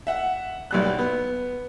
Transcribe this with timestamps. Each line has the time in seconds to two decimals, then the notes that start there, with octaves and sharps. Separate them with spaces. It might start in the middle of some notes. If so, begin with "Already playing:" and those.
0.07 E5 F#5
0.71 B1 G3 F#6
0.99 B3